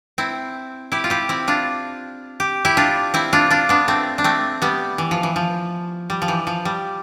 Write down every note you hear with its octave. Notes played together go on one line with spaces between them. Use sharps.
C4 E4
E4 G4
F4
E4 G4
C4 E4
D4 F4
G4
E4 G4
D4 F4
C4 E4
D4 F4
D4 F4
B3 D4
A3 C4
D4
A3 C4
G3 B3
E3
F3
E3
F3
G3
F3
E3
F3
G3